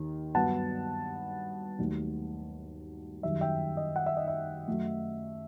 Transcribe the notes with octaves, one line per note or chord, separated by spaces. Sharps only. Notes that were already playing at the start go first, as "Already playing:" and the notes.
Already playing: D#2 D#3
G2 F#3 B3 F#5 A5
D#2 D#3 F#3 A3
F#2 D#3 G3 E5
E5 G5
D#5
F#5
E5
D#5
E5
F#2 F#3 A3